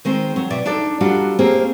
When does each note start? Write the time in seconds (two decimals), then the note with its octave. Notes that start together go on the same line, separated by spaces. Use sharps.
0.05 D#3 G#3 C4
0.36 F#3
0.50 B2 D5 E5
0.66 D4 D#4 A4 D5
1.01 F#3 G3 D4 F4 F#4
1.39 A#3 C4 C#4 G4 G#4